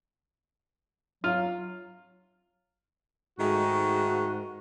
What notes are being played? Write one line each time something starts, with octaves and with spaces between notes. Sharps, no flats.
F#3 F4 F5
G#2 D#3 G#3 A3 F#4